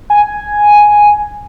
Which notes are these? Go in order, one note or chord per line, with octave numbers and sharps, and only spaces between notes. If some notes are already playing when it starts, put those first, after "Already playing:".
G#5